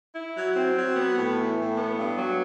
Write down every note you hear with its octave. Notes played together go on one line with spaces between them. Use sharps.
E4
F#3
C4
F#3
B3
A2
E3
A2
B3
G2
F#3